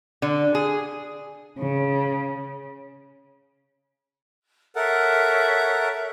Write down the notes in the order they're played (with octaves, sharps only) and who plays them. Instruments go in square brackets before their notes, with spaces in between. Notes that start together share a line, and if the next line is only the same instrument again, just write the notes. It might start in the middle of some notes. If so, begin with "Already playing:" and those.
[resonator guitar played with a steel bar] D3
G#4
[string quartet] C#3
[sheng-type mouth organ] A4 A#4 F#5 [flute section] C#5 E5